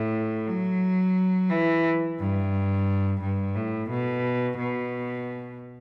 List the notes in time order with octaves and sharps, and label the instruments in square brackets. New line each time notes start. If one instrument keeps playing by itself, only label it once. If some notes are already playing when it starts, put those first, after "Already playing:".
Already playing: [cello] A2
F#3
E3
G2
G2
A2
B2
B2